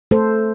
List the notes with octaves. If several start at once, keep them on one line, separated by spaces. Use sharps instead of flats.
A3 A4 C5